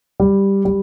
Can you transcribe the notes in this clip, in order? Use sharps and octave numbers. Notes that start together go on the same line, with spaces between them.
G3
G3